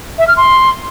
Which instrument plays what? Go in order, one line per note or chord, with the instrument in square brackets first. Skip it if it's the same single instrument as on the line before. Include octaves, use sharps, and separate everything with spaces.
[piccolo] E5
F6
C6